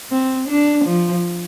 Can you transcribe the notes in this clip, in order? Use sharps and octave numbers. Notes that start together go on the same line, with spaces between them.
C4
D4
F3